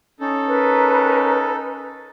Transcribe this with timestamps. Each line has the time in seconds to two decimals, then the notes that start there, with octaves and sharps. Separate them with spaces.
0.20 C#4 D#4 A4
0.48 A#4 B4